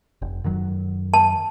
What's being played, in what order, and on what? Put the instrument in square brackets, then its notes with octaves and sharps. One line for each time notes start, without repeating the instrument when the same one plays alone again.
[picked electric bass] F1
F#2 D#3 F#3
[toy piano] A5